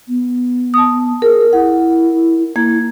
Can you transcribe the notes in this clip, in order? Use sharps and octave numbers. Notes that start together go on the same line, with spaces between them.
B3
A5 D#6
G#4 A#4
E4 F#5
A#3 E4 G#6